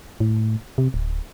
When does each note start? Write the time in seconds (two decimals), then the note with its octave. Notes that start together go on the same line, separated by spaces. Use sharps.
0.20 A2
0.78 C3
0.94 D1